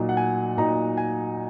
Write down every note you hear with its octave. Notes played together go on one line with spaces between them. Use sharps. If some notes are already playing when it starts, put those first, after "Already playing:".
Already playing: A#2 F#3 D#4
F#5
G#5
A#2 F#3 D#4 A#5
G#5